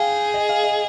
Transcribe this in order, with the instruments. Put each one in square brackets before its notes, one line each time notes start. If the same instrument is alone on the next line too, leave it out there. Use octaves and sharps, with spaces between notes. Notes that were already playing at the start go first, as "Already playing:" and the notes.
Already playing: [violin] G#4 [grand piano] F5 G5
[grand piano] D#5
F5
D#5